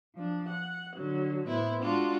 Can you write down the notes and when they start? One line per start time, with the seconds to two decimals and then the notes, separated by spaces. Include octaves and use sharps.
0.15 F3 D4
0.49 F#5
0.95 D3 F#3
1.47 A2 B3 E4 C5
1.81 G#3 D4 F4 F#4